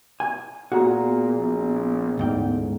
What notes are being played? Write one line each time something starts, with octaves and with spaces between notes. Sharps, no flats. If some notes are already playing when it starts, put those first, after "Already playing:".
G#5
A#2 B3 F#4 G#4 A#5
A#1
A1 D2 G#2 G5